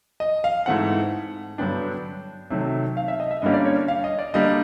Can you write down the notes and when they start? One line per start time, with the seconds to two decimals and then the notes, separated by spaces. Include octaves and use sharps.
0.20 D#5
0.44 F5
0.66 G#2 E3 A3 C4 F#5
1.58 G2 D3 F#3 B3 D4 G5
2.50 C3 D#3 F#3 A3
2.97 F5
3.08 E5
3.20 D#5
3.31 E5
3.42 G2 D3 G3 A#3 C#4 D#5
3.54 D5
3.65 C#5
3.88 F5
4.04 D#5
4.19 D5
4.34 D3 G3 A#3 D4 D#5